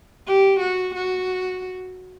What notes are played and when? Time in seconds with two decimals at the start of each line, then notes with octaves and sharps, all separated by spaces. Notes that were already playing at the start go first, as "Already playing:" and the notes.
0.27 G4
0.60 F#4
0.95 F#4